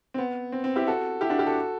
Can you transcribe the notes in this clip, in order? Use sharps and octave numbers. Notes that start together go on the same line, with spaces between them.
C4
B3
C4
C4
E4 G4
F#4 A4
E4 G4
D4 F#4
E4 G4
F#4 A4